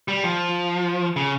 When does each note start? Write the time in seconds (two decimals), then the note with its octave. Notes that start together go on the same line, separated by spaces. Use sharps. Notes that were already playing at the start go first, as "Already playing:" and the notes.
0.08 G3
0.24 F3
1.16 C#3